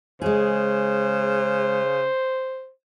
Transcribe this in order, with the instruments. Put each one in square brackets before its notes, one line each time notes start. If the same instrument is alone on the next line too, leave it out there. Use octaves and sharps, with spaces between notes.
[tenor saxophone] C#3 [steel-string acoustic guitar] G#3 G#4 [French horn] C5